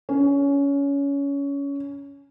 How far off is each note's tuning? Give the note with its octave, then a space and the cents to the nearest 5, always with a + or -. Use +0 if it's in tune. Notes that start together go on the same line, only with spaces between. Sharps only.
C#4 +20